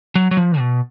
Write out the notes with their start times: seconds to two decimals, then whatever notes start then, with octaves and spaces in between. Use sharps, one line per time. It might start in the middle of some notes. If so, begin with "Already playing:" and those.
0.15 F#3
0.31 F#3
0.37 F3
0.58 B2